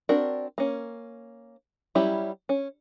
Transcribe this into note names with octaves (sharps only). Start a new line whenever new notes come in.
C4 D4 F#4 A#4
A#3 C#4
F#3 G3 C#4 E4 G4
C#4